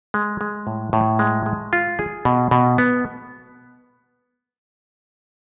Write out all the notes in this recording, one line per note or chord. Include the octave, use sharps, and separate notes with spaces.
G#3
G#3
A2
A2
G#3
G#3
F4
G#4
B2
B2
B3